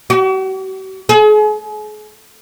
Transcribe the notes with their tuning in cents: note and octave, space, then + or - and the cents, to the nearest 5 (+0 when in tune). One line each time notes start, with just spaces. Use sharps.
F#4 +45
G#4 +40